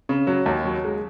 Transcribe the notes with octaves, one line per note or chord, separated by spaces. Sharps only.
C#3
F#3
D#2
F#3
G#3